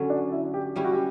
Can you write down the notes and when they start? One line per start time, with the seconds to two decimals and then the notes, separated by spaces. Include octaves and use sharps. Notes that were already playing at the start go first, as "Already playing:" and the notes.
Already playing: D3 F#3 C#4
0.10 D4
0.32 E4
0.54 G4
0.76 G3 C#4 E4 G4
0.84 F#4
0.93 G4